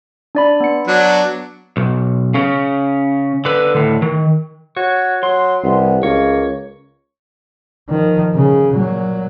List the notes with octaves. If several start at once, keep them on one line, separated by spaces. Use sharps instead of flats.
D4 D5 B5
B3 C#7
F#3 D4
B1
C#3 C#4
D3 B4
A2 D3
D#3
F#4 C#5
F#3 C6
C2 B3
C#2 A#3 C#5
D#3 F3
C#3
A#2 F#3